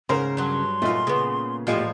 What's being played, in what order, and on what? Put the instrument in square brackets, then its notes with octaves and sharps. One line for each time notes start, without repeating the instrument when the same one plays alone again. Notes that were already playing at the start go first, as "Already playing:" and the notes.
[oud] G#2 [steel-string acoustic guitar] C#3 [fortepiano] A#4 C5
[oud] G2 F#3 [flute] C6
[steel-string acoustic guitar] A#2 [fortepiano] A3 D#4 F4
[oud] C#3 B3
[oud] E2 A2 F3 [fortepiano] G#3 F4 [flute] G4